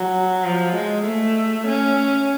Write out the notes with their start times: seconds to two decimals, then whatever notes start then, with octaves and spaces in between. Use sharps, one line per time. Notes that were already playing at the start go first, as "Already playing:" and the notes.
Already playing: F#3
0.44 F3
0.75 G#3
1.06 A3
1.67 C#4